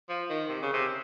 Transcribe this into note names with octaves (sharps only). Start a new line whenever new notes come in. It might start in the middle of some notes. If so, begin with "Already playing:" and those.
F3
D#3
C3
C#3
C3